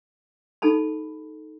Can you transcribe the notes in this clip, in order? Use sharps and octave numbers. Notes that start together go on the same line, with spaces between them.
D#4 G4 A4 A5 B5